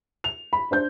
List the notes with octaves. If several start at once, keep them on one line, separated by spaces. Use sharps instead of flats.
F7
B5
D4 C5 G6